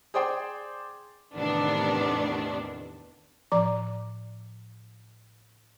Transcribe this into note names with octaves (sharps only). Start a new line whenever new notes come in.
G#4 C5 D5 G5 C6
E2 A2 C3 D#3 B3 D4
A2 F3 D5 A#5 D6